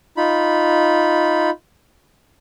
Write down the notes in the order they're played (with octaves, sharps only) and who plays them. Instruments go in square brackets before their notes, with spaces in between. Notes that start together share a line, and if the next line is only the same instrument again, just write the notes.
[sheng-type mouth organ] D#4 F4 B5